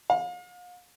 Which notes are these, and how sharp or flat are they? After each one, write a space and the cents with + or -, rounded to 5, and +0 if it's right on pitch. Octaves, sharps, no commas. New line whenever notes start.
F5 +40